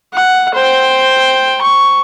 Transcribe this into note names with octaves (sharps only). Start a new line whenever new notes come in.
F#5
C5 G5
C#6